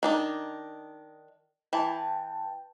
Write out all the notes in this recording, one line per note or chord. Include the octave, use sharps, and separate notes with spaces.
D#3 D4 D#4
E3 G5 A5